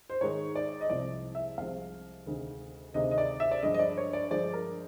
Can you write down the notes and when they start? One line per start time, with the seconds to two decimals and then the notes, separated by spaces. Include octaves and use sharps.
0.10 C5
0.21 G#2 D#3 G#3 C#5
0.55 D5
0.81 D#5
0.89 C2 C3 F3 G#3 D5
1.35 E5
1.58 C2 C3 F3 G#3 F5
2.26 D2 C3 D#3 G#3
2.94 D2 C3 D#3 G#3 D#5
3.11 D#5
3.18 D5
3.40 E5
3.51 D5
3.63 G2 D3 F3 G#3 D#5
3.74 D#5
3.79 D5
3.98 C#5
4.13 D5
4.31 G2 D3 F3 G#3 D5
4.54 A#4